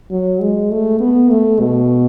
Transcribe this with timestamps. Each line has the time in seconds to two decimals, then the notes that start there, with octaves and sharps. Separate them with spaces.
0.10 F#3
0.40 G#3
0.71 A3
1.00 B3
1.30 A3
1.60 B2